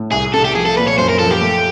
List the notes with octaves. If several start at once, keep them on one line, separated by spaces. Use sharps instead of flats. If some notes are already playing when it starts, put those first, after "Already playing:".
Already playing: A2
C2 G#4
C3 A4
G4
F3 G#4
A4
A#2 B4
C#5
F#2 C5
A#4
F3 A4
G4
A3